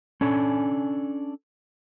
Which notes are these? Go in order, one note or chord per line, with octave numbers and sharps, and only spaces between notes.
C#4 D4 A4 G#5